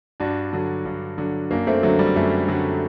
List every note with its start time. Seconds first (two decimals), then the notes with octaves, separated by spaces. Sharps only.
0.20 G2 D4 F#4
0.53 D3 F#3
0.85 G2
1.18 D3 F#3
1.51 F#2 A#3 D4
1.67 A3 C4
1.83 D3 F#3 A3
1.99 G3
2.16 F#2 A3
2.48 D3 F#3